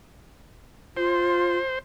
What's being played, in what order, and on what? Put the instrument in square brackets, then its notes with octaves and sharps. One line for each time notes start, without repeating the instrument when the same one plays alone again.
[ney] F4 [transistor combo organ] C5